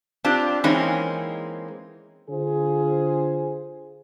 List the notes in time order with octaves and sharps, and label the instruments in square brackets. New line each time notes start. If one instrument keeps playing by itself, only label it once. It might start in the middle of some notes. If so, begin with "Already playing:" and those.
[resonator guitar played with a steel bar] C4 D4 F4 G4
E3 G#3 A#3 C4 C#4 D#4
[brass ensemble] D3 F4 G#4 C5